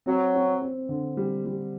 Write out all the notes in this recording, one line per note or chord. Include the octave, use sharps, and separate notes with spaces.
F#3 C4
C4
C4
D3
G3
G3